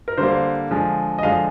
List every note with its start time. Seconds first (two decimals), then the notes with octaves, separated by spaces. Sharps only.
0.08 A#4
0.17 D3 G3 A#3 C5
0.71 D3 F3 G#3
1.19 D#5
1.23 D3 F3 G#3 F5